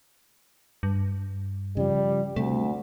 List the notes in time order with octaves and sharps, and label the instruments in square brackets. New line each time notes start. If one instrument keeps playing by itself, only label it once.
[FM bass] G2
[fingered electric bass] C#3 F3 [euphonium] G3
[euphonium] D2 [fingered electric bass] C3 G3 [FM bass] A3